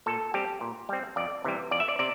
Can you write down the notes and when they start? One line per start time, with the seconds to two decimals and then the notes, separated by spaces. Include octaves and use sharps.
0.06 A#2 A4
0.34 G3 C4 G4
0.61 A#2
0.89 G3 C4
1.16 F2 D5
1.44 C3 E3 G3
1.71 F2 D5
1.80 E5
1.88 D5
1.99 C3 D5